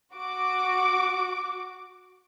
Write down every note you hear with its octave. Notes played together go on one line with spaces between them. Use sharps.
F#4 D6